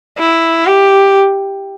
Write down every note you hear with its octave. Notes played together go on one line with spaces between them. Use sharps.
E4
G4